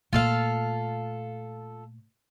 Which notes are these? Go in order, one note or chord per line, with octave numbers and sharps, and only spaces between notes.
A#2 A3 F4 A4 F5